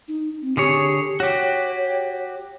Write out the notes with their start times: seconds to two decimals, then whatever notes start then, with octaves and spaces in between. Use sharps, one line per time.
0.08 D#4
0.42 C4
0.57 D3 G4 G#4 C#5
1.20 F#4 G4 C#5